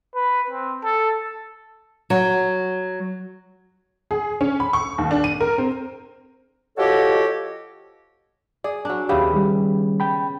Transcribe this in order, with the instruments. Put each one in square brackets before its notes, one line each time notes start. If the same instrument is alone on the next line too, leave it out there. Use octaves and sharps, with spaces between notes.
[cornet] B4
C4
A4
[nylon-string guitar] F#3
[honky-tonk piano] G#4
C#4
B5
C#6
D#2
D4
D#7
A#4
C4
[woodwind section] F3 F#4 G4 A4 C#5 D#5
[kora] G#4 [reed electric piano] D5
[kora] F#3 D4
[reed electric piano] D#2 G4 [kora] C#3 B3 E4
[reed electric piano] D#3 G3
G5 B5